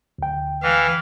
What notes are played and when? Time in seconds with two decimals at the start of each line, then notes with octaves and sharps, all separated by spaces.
0.19 D2 G5
0.63 E3 F5